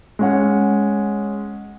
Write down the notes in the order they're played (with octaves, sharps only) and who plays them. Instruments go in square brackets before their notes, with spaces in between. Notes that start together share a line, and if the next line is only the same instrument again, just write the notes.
[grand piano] G#3 C#4 F#5